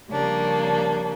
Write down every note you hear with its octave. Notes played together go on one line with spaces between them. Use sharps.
C#3 F3 G3 A#3 D4